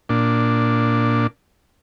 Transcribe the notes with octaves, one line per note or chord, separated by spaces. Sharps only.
A#2 D4